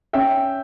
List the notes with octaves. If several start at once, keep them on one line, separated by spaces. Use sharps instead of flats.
C#4 E5 G5